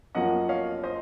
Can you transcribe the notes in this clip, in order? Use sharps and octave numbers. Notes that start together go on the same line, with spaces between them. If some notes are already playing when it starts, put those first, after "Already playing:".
F#2 F3 A#3 C#4 D#5 F#5
C#5 F5
C5 D#5